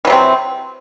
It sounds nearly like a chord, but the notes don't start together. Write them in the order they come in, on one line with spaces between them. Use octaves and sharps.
E3 F#3 C3 C4